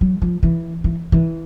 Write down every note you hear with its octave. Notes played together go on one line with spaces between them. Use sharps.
F#3
F3
E3
E3
E3